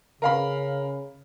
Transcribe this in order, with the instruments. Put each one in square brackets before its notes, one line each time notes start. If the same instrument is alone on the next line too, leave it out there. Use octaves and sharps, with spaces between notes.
[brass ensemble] C#3 [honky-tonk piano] A#4 F5 B5